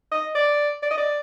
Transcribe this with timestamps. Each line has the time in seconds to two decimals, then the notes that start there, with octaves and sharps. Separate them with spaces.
0.11 D#5
0.35 D5
0.83 D5
0.91 D#5
0.98 D5